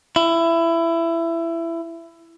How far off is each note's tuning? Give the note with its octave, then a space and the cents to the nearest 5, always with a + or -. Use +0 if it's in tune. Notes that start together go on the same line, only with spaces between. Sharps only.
E4 +20